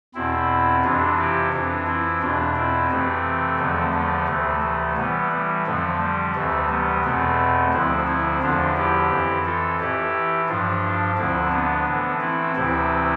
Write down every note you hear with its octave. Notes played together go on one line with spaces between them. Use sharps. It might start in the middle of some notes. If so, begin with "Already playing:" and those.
E2 B2 C4 E4
F2 C3 E3 D4 F4
E4 G4
F2 E3 D4 F4
C4 E4
E2 B2 D4 F4
C4 E4
F2 C3 E3 A3 C4
E2 D3 F3
A3
D2 C3 E3
A3
A2 E3 G3 B3
G3
F2 D3 F3 A3
G3
D2 C3 E3 A3
G3 B3
E2 B2 A3 C4
D2 D3 F3 C4 E4
C4 E4
E2 D3 F3 D4 F4
E4 G4
F2 E3
F4 A4
A2 E3 E4 G4
G2 F3 D4 F4
D2 D3 F3 C4 E4
B3 D4
A2 E3
C4 E4
D2 C3 E3 C4 E4